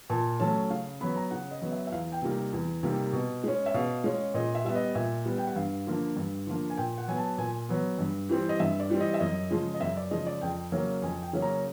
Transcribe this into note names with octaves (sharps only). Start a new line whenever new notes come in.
A#2 A5
F#3 A3 C#4 A5
C#3 F5
F#3 B3 B5
A#5
C#3 F#5
D#5
F#3 B3
E5
E5
E2 F5
G5
C3 D#3 G3 A#3
E2
C3 D#3 G3 A#3
B2
G#3 C#4
E5
B2 F5
G#3 C#4
A#2 D#5
E5
G3 B3 E5
D#5
A#2 E5
G3 B3
G5
F#5
G2 F5
D3 F3 A#3
G2
D3 F3 A#3
G#5
A#2 G5
F#5
F#3 B3 G#5
A5
A#2 G#5
F#3 B3
G2
E3 G3 C4
D#5
G2 E5
D5
E3 G3 C4
D#5
E5
F#2 D#5
C#3 F3 G#3
D#5
F#2 E5
D5
C#3 F3 G#3 D#5
D5
F2 G5
C#3 F#3 A#3 C#4
F2 G#5
G5
C#3 F#3 A#3 C#4
A#5